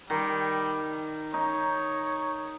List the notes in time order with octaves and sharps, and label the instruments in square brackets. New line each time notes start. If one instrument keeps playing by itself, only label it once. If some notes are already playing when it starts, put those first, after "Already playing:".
[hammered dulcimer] D#3 [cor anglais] G3
[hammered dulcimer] D#4 [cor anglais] C#5